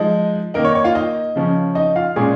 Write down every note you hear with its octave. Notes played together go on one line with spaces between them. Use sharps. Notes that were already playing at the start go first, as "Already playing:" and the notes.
Already playing: F3 G#3 D#4 D#5
D#3 A#3 D#4 A#4
C#5
C#5
F4 F5
D#4 D#5
C#3 F3 C#4
D#4 D#5
F4 F5
A#2 G#3 C#4 G#4 G#5